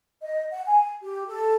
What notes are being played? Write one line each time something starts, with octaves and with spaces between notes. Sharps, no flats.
D#5
F#5
G#5
G4
A4